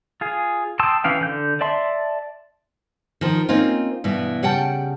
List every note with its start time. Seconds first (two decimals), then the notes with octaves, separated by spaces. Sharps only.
0.21 F4 G#4
0.79 G5 A5 C6 D#6 E6
1.04 E3 C#4 F5 G5
1.21 D3 G6
1.61 D5 E5 A5 C6
3.21 D#3 F3
3.49 A#3 C4 C#4 D#4 F4
4.04 G2 B2 E3
4.43 C#3 G3 F#5 G5 A5